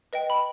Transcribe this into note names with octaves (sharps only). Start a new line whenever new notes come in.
B4 D#5 G5
B5